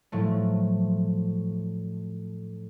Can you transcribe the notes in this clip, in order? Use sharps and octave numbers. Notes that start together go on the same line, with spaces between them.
A2 F3 F#3 A3